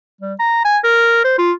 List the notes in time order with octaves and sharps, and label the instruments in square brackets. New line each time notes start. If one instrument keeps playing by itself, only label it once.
[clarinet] G3
A#5
G#5
A#4
C5
F4